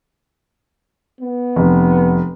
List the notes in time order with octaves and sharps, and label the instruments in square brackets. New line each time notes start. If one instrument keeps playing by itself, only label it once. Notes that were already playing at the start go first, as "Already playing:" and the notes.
[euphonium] B3
[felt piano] F1